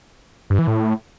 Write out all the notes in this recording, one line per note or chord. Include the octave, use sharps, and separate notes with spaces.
G2
E3
A2